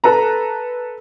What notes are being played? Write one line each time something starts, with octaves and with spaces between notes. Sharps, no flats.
A4 B4 A#5